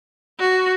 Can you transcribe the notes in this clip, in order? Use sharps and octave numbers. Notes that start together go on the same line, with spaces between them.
F#4